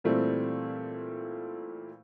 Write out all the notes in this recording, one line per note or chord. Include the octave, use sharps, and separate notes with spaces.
A#2 E3 G3 A3 C4